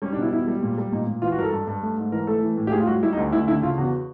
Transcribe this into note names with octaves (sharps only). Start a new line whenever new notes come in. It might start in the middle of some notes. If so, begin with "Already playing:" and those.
G3 C#4
D4
B2
E4
E2 E4
G3
A#2
G3
A#2 D#4
A#2
E3 F4
F#4
G2 A#4
A4
G2
G2
A3
G#2
E3 A#4
A3 A4
E3
A2
G4
A2 G#4
F4
G3 F#4
G3 E4
D#4
D2
D2 E4
D3 E4
C#3 F4
E2 F#4